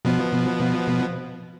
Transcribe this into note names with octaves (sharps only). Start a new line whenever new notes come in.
B2 F3 B3